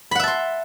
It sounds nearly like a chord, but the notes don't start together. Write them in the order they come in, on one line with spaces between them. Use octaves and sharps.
B5 F#5 E5 A5 C6